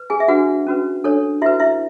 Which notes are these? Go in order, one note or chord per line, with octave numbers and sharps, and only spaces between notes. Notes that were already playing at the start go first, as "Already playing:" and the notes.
Already playing: B4
G#4 G#5
E5
D4 F#4 G#4 B4 F#5
C#4 F#4 B4
D4 A4 C#5
E4 F#4 B4 E5
E4 E5